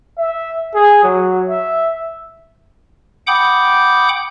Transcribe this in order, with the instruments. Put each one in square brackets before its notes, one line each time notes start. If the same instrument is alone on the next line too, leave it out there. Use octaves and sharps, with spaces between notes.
[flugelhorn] E5
G#4
F#3
E5
[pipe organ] F#5 G5 B5 D6 D#6 G6